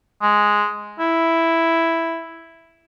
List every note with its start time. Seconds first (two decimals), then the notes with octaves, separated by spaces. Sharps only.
0.22 G#3
0.99 E4